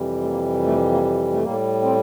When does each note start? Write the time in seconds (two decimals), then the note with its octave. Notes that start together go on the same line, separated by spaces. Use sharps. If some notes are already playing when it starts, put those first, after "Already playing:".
Already playing: F2 C3 E3 G3
0.23 A3
0.27 A#3
0.66 A3
0.92 A#3
1.32 A3
1.43 A2 G3 A#3
1.82 C4